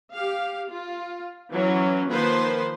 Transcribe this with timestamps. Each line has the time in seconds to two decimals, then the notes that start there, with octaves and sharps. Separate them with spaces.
0.12 G4 F5
0.70 F4
1.52 E3 F#3 C#4
2.09 D#3 F3 A#3 B4 C5 C6